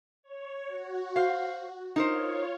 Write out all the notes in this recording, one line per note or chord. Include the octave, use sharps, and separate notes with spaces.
C#5
F#4
C5 F5
D#4 F4 A#4 C5 C#5